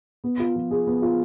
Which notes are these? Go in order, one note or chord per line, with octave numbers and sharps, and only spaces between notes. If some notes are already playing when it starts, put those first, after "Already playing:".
B3
F4
F3
G#4
B3
F4